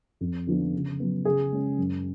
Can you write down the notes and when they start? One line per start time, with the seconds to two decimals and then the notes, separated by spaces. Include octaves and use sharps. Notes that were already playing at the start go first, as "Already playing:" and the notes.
0.21 F2
0.47 D3 F3 B3 D4
0.74 C#3
1.00 F#3 B3
1.25 C#3 G#4
1.52 G#3 C#4
1.78 F#2